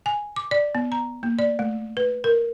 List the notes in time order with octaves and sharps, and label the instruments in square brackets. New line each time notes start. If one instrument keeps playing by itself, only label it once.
[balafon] G#5
D6
D5
B3
A#5
A#3
D5
A3
B4
A#4